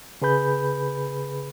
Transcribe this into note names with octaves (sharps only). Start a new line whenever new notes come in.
C#3 G#4 B4 B5 G6